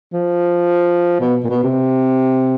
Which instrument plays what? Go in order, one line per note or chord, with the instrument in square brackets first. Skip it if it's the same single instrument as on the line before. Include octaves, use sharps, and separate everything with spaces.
[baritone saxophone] F3
B2
A#2
B2
C3